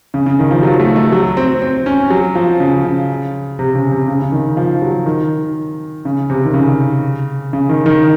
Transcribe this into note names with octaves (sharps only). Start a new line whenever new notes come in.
C#3
C#3
D#3
F3
F#3
F#3
A3
A3
F#3
C4
C4
C#4
F#3
F3
C#3
C#3
C3
C#3
C3
C#3
C#3
D#3
F3
F#3
D#3
C#3
C3
D#3
C#3
C#3
D#3
D#3